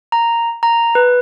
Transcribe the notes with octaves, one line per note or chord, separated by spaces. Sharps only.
A#5
A#5
B4